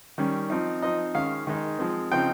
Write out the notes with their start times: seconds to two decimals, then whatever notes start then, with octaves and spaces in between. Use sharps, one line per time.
0.18 D#3 G3 C#4
0.50 F3 C4 D#4
0.82 F3 C4 D#4 D#5
1.14 D#3 G#3 C#4 F5
1.47 D#3 G#3 D#4
1.79 F3 G#3 C4
2.12 C#3 F3 C4 D#4 G5